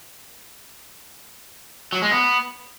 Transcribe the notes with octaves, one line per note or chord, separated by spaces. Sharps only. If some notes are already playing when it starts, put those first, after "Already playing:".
F#3
G#3
B3